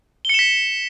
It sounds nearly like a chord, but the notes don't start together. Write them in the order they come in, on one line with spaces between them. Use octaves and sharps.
G7 C#7 E7 B6